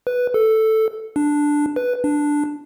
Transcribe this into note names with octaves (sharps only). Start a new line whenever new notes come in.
B4
A4
D4
B4
D4